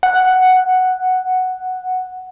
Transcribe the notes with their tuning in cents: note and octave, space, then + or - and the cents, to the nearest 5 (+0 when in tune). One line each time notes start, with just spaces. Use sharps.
F#5 +0